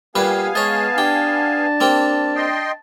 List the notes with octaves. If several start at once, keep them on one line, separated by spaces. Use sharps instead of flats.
A#2 G3 B3 G4 B4 F5 G#5
G#3 C#5 D#5 A5
D4 G4
A#3 C4 G4
D#5 G5 C6